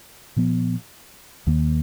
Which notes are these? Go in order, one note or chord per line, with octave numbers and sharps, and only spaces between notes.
A#2 F3 B3
D#2 D#3 A#3